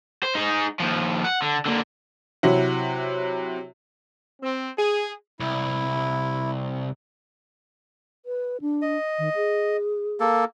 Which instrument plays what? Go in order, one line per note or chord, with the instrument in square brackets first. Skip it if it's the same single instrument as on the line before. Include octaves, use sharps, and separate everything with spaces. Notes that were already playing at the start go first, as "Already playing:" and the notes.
[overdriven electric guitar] C5
D#4 G#4
D#2 F3
F#5
D3
D3 A#3
[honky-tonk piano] C3 F#3 E4 F#4
[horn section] C4
G#4
[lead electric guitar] C2 [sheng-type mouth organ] E4
[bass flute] B4
D4
[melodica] D#5
[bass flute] D#3
G#4
[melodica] A#3 A4